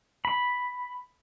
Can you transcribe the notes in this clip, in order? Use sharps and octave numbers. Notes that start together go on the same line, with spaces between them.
B5